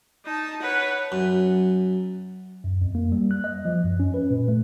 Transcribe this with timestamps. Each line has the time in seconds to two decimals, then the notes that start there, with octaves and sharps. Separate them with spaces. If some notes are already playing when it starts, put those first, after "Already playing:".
0.25 D#4 A5
0.62 B4 C#5 F#5
1.12 F#2
2.64 F#2
2.81 F2
2.95 A#3
3.12 G3
3.31 F#6
3.44 D#5
3.65 F3
3.84 F#2
4.00 C#4
4.14 B4
4.30 A#2
4.48 A3